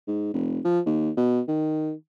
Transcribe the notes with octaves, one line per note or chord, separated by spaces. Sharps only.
G#2
F1
F3
D#2
B2
D#3